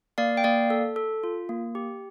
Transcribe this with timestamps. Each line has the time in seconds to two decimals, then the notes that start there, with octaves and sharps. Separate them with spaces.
0.18 A#3 D5 F5
0.37 G5
0.44 A#3 D5 F5
0.70 A4
0.96 A4
1.23 F4
1.49 A#3
1.75 G4